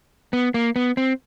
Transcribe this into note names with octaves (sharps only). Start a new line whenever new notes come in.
B3
A#3
B3
C4